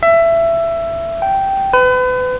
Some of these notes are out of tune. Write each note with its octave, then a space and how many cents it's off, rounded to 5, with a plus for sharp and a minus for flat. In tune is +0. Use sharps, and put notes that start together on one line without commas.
E5 +20
G5 -10
B4 +35